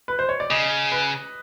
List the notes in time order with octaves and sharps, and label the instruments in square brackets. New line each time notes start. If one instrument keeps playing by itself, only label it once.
[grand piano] B4
C5
C#5
D5
[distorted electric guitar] C#3 [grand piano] D#5
[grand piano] B4